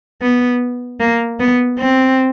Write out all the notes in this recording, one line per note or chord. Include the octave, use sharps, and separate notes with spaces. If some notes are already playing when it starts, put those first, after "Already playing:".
B3
A#3
B3
C4